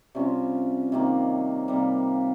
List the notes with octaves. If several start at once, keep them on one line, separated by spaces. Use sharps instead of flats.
C3 G3 C#4 F4
C3 D#3 A#3
C3 G3 A#3